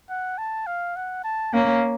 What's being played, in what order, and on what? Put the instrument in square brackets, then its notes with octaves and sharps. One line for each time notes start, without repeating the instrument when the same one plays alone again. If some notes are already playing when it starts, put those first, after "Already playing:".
[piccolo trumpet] F#5
A5
F5
F#5
A5
[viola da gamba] A#3 C#4 [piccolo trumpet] F5